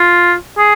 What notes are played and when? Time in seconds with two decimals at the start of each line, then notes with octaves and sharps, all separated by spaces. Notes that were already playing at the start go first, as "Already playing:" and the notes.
Already playing: F4
0.58 G#4